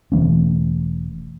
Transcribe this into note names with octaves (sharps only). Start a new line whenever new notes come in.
E1 E3 A3 C#4